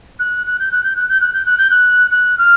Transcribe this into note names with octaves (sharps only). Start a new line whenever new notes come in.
F#6
F#6
G6
F#6
G6
F#6
G6
F#6
G6
F#6
G6
F#6
F#6
F6